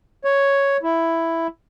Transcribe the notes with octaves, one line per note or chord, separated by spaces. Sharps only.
C#5
E4